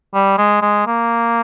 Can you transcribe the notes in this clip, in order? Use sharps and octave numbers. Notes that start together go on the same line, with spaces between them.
G3
G#3
G#3
A#3